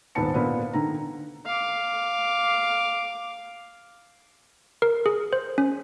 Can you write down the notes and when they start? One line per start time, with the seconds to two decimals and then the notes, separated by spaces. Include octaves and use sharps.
0.15 D#1 G#2 B3 A5 C#7
0.34 A#2 D3 B3 C4 D4
0.73 D3 D#3 A#5
1.46 F5 D6
4.82 A#4
5.06 G#4
5.33 C5
5.58 C#4